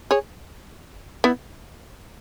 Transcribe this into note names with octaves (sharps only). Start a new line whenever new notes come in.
G#4 C#5
B3 E4